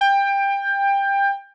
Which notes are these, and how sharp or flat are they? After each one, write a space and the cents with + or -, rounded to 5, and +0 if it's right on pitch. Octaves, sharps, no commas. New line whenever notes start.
G5 +20